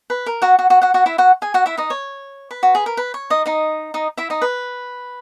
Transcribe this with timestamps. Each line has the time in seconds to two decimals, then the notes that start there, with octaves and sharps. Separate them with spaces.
0.10 B4
0.26 A#4
0.42 F#4 F#5
0.59 F#4 F#5
0.70 F#4 F#5
0.82 F#4 F#5
0.94 F#4 F#5
1.06 E4 E5
1.18 F#4 F#5
1.42 G#4 G#5
1.54 F#4 F#5
1.66 E4 E5
1.77 D#4 D#5
1.90 C#5
2.51 B4
2.63 F#4
2.75 G#4
2.86 A#4
2.97 B4
3.14 C#5
3.30 D#4 D#5
3.46 D#4 D#5
3.94 D#4 D#5
4.17 E4 E5
4.30 D#4 D#5
4.42 B4